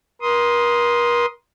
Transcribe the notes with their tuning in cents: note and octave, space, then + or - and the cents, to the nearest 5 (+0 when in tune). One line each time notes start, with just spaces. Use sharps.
A#4 +40 C6 +0 D#6 +0